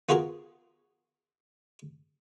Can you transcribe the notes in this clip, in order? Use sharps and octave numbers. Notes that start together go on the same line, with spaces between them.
B3 F4 F#4 G#4 A#4